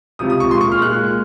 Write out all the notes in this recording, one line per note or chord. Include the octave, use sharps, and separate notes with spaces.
C#2 C3 F3 D#6
D#6
C#6
A#2 G#3 C6
C#6
F6
A#2 G#3 F#6